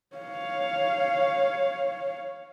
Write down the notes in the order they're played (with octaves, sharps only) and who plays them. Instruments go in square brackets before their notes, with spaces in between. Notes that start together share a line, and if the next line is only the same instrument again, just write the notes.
[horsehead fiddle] C#5 F5